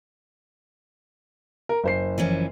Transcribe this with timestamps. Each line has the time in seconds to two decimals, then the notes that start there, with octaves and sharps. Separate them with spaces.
1.69 A#4
1.83 F#1 C5 C7
2.18 E3 F3 C#4